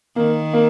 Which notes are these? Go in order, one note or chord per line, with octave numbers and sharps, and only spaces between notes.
D#3 A#3
A#3